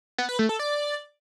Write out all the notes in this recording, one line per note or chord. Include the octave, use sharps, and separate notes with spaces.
B3
B4
A3
A4
D5